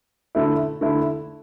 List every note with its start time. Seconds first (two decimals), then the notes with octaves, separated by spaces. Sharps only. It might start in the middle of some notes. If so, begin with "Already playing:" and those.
0.35 D3 A3 E4
0.81 D3 A3 E4